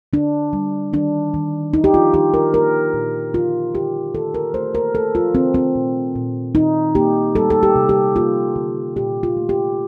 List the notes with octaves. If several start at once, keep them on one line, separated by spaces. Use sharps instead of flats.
D3 D4
G3
D#3 D4
D#3
D#3 D#4
G4
F4
D#3 G4
A#4
A#3 A#4
A#2
D3 F4
D3 G4
D#3 A4
A#4
A3 C5
A#4
A3 A4
F4
D#3 C4
C4
A#2
A#2
D#3 D#4
A#3 G4
G3 A4
A4
G4
C3
G4
A#3 F4
D3
A#2 G4
F4
A3
G4